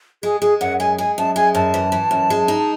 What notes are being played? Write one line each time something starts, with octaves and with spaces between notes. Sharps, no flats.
G#3 G#4
G#3 G#4
F#2 F#5
G#3 G#5
G#3 G#5
F#2 A5
G#3 G#5
F#2 A5
E3
E3
F#2
G#3
D#4